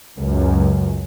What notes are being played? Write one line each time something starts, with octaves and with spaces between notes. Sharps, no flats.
C#2 F#2